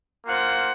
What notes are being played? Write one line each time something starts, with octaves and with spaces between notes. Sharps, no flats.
A#3 F4 C5 F#5